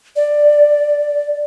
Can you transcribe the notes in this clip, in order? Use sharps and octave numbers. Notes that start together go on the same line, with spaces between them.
D5